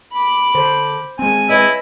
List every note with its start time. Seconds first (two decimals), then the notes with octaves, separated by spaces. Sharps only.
0.13 B5 D6
0.55 D3 C5
1.19 G#3 C4 G#5
1.50 E4 B4 C#5 D#5